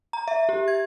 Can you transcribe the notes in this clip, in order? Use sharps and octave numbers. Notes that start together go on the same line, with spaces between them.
A#5
E5
G4
G#6